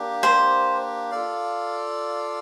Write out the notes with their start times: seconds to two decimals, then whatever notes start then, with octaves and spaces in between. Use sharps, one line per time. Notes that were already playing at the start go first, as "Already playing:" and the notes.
Already playing: A#3 D4 G4
0.23 C5
1.11 F4 A4 D5 F5